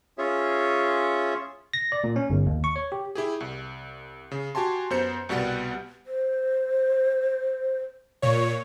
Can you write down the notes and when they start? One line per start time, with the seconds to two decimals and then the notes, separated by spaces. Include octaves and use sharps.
0.18 C#4 F4 G#4 C#5 E5
1.74 A#6
1.92 D5
2.04 A#2
2.16 C#4
2.30 G1
2.46 D#2
2.64 C#6
2.76 C#5
2.92 G4
3.15 E4 G4 G#4
3.40 C2
4.31 C#3
4.55 F#4 G4 G#5 A5 C6
4.90 F#2 B3 C5 G6 C#7
5.29 C2 B2 G3 B3 F#5 A6
6.07 C5
8.22 A#2 C#5